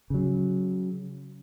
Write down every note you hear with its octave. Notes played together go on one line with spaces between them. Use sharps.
C#3 F#3